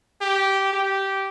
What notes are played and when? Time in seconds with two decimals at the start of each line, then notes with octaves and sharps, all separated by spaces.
0.21 G4
0.73 G4